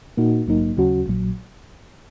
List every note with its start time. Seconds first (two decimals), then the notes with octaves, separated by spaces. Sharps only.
0.17 A#2 A#3 D#4 F#4
0.47 A#1 G#2 F#3 A#3 D#4
0.77 D#2 C#3 F#3 C#4 F#4
1.06 A#1 A#2 F#3